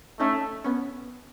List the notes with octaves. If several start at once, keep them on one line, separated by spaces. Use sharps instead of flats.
A3 C#4 D#4
B3 C#4